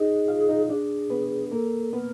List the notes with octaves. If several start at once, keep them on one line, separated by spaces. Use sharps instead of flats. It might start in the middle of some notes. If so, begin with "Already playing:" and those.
Already playing: D#4 G#4 D#5
F4 F5
D#4 D#5
D4 G#4 D5
B3 B4
A#3 A4 A#4
B3 A#4 B4